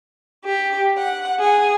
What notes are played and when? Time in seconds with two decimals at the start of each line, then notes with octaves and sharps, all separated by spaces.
0.44 G4
0.97 F#5
1.39 G#4